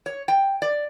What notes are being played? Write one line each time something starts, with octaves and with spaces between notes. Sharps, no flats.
C#5
G5
D5